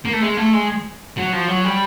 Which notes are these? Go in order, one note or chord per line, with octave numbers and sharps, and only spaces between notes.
A#3
A3
G#3
A3
G#3
F#3
F3
F#3
G3